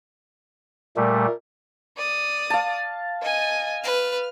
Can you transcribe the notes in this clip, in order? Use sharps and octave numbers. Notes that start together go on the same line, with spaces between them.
A#2 G3 A3 A#4
D5 D#6
F5 A5
D#5 G#5
B4 F6